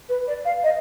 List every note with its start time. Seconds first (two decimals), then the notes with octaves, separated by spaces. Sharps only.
0.09 B4
0.27 D5
0.45 F5
0.64 D#5